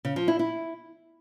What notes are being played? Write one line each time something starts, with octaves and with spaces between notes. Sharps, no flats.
C#3
F3
E4
E4